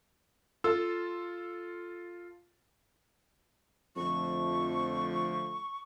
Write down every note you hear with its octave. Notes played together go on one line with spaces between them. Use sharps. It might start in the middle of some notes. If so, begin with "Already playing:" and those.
F4 A4 E6
F2 D3 F3 A3 C#6